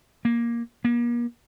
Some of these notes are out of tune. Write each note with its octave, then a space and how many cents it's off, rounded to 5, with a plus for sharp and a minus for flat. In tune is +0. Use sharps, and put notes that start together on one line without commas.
A#3 +10
A#3 +40